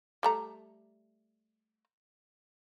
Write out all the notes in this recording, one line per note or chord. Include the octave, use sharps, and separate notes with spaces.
G3 A3 A#5